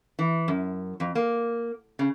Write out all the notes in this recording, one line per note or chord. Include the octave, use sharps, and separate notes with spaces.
E3
F#2
F2
A#3
C#3